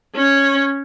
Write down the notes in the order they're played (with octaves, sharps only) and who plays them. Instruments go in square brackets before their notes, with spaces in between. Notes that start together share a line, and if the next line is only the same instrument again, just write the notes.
[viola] C#4 C#5